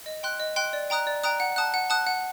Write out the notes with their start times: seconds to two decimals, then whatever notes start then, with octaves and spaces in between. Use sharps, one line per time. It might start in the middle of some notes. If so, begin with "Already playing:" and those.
0.06 D#5
0.23 G5 C6 F#6
0.40 D#5
0.56 G5 C6 F#6
0.73 D5
0.90 G5 A#5 D#6 F#6
1.07 D5
1.23 G5 A#5 D#6 F#6
1.40 F#5
1.56 A5 D#6 F#6
1.74 F#5
1.90 A5 D#6 F#6
2.07 F#5